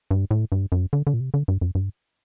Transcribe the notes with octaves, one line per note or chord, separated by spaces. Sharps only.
G2
A2
G2
F#2
D3
D3
A#2
C3
D3
G2
F#2
G2